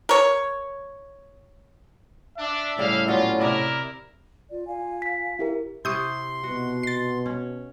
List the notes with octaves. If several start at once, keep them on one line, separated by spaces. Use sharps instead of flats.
A#4 C#5
D4 E5
A2 C#3 G3 A#3 F5
A#2 F#3 B3 C#4 F4
C3 E4 A#4 D5 D#5
F4 D5
F4 F5 G#5
B6
E4 G4 A#4 E5
C3 E4 C6 C#6 D#6 G6
B2 F#4
A6 C7
C#4